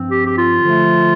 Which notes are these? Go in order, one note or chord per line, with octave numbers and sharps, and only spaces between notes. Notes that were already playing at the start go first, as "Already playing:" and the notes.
Already playing: G2 F3 C4
G4
G4
F4
D3 F3 A3